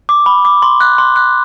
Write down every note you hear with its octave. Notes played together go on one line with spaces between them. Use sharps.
D6
B5
D6
C6
F#6
C6
F#6